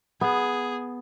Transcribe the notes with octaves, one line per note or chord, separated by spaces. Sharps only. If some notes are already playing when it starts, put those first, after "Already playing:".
B3 G#4